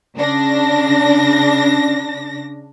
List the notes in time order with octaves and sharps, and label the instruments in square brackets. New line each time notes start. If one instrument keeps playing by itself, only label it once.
[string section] C#3 D4 A#6